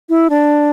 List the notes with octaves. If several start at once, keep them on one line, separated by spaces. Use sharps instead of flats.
E4
D4